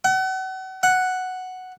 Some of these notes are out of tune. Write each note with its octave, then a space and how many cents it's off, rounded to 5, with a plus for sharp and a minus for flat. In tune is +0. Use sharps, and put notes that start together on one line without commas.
F#5 +35
F#5 +0